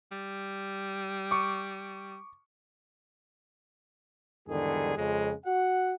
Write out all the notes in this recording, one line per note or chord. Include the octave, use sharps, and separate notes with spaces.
G3
C#6 D6
E2 G#2 D3 D#3 G3 G#4
F2 C#3 G#3
F#4 F#5